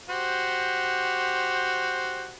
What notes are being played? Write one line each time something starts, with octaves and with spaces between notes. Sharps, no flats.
F#4 G4 C5